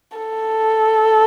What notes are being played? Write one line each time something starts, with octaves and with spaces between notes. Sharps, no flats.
A4